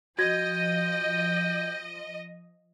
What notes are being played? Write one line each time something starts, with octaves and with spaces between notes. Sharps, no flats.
F3 F#4 D#5 G5 G#6 A#6